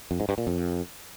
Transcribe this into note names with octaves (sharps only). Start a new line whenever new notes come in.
F2
G#2
G2
A#2
F2